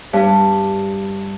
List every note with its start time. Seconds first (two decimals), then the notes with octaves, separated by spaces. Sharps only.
0.13 G2